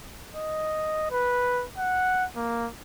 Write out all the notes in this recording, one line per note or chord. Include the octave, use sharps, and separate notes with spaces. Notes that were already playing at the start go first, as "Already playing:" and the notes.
D#5
B4
F#5
A#3